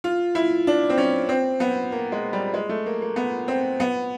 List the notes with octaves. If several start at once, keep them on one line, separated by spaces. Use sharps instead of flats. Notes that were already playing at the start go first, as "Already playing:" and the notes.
F4
E4
D4
C4
C#4
C4
B3
A#3
G#3
G3
G#3
A3
A#3
A#3
B3
C4
B3